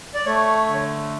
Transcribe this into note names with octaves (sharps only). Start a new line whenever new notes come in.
D5
A3 C#5
D3